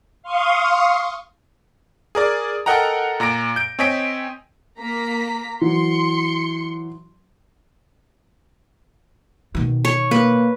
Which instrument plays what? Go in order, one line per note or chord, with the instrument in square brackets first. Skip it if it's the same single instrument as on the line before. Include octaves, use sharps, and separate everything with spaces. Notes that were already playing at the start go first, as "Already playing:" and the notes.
[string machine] F5 C6 C#6 D#6
[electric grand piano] G#4 A#4 D5
A4 A#4 D#5 F#5 G5 A#5
A#2 A#5 A#6 D7
G6 D7
C4 C#5 D#5 G#5 B6 D7
[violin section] A#3 A#5 B6
[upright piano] E3 F#3 [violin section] C6 C#7
[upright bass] B2 D#3
[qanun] C#5
[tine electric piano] A#3 [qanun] B4